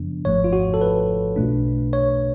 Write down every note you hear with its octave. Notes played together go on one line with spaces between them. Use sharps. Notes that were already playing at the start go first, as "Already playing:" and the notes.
Already playing: F#2 C#3 F3 B3 D4
G#1 G#2 F3 A3 C#5
F4
F#4
A4
B4
B1 B2 A3 D4
C#5